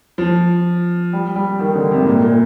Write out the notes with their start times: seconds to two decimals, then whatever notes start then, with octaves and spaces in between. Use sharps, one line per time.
0.18 F3
1.13 G3
1.35 G3
1.60 D#3
1.75 D3
1.91 C3
2.02 G#2
2.06 A#2
2.22 A#2